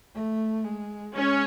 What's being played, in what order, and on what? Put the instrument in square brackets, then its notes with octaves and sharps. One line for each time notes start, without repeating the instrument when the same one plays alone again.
[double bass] A3
G#3
[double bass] G#3 [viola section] C#4